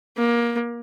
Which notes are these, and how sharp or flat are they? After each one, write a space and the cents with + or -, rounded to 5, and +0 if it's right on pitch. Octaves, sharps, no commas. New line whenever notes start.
A#3 +20